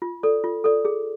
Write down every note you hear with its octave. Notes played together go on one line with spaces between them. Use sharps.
F4
A4 D5
F4
A4 D5
G#4